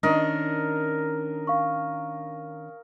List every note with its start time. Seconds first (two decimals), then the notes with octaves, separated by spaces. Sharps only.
0.03 D#3 C#4 D4 A#4 D#5
1.47 F5 C#6